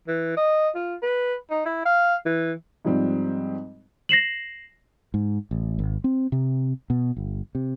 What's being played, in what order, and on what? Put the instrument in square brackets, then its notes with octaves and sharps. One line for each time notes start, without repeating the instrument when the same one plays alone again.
[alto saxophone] E3
D#5
F4
B4
D#4
E4
F5
E3
[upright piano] G#2 F3 G3 C4
[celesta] A#6 C7 E7 F#7
[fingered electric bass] G#2
A1
G#1
C4
C3
B2
G1
C3